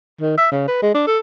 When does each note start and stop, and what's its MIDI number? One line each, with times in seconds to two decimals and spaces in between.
0.21 0.37 51
0.38 0.51 76
0.52 0.66 49
0.68 0.78 71
0.82 0.91 56
0.95 1.04 62
1.07 1.18 69